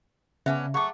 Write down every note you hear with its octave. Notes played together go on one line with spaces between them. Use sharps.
C#3 B3 C#4 D4 E5
F#3 A3 G#4 F#5 C#6 D6